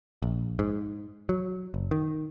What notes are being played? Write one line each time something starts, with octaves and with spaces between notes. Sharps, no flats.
A#1
G#2
F#3
F#1
D#3